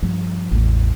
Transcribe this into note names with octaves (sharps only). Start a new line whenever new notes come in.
G2 F3
A1 E2